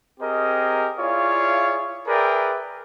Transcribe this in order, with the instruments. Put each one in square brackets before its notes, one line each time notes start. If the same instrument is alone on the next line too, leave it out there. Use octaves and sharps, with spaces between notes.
[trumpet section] C4 G4 G#4 A#4 D#5
E4 F4 G#4 C#5 D5 F5
G#4 A#4 B4 D5 E5 G5